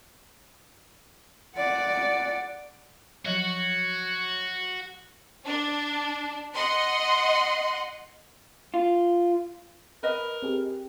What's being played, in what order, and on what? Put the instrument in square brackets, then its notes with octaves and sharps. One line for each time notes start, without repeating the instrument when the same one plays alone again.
[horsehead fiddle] D5 F#5
[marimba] F3 F#3 [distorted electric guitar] F#4 [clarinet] C#5
[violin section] D4
D#5 F#5 C6
[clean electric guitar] F4
[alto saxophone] A#4 [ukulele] B4 D#5
[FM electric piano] C4 G4 G#4